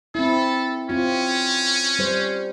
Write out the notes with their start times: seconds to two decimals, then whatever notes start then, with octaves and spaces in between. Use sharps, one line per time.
0.15 C4 E4 A4
0.90 C4 C#4 F4
1.99 G3 C5